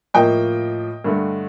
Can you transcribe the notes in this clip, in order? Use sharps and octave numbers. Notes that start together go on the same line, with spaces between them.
A2 F3 A#3 D#5 G5
G2 D3 A3